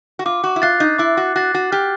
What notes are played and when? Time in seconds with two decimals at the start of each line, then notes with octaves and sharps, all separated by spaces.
0.19 F#4
0.26 F4 D6
0.44 F#4
0.56 E4
0.62 F4 F#6 A6 C7
0.80 D#4
0.98 E4 D6
1.17 F#4
1.36 F#4 F#6 A6 C7
1.55 F#4
1.72 G4 F6